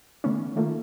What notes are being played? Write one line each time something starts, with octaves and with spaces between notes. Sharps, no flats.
D3 D#3 A3 B3 C#4
D#3 A3 A#3 F4